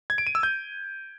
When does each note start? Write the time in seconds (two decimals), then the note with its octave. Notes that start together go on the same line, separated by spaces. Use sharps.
0.10 G#6
0.18 D7
0.27 D#7
0.35 E6
0.43 G6